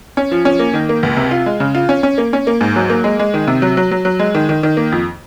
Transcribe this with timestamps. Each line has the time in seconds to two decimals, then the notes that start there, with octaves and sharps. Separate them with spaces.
0.17 C#4
0.31 F3
0.45 C#4
0.59 A#3
0.74 D#3
0.89 A#3
1.03 C#2
1.17 C3
1.31 F4
1.46 G#3
1.60 C#3
1.75 F4
1.89 C#4
2.03 C#4
2.18 A#3
2.33 C#4
2.47 A#3
2.61 G#2
2.76 F#3
2.90 A#3
3.04 G#3
3.19 G#3
3.34 D#3
3.48 C3
3.62 F#3
3.77 F#3
3.91 F#3
4.05 F#3
4.19 G#3
4.35 D#3
4.49 D#3
4.63 D#3
4.77 A#3
4.92 F2